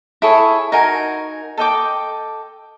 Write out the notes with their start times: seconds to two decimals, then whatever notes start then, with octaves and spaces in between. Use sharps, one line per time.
0.22 E4 G#4 A4 C#5
0.72 D#4 F#4 A#4 G#5
1.58 A4 D#5 G5 D6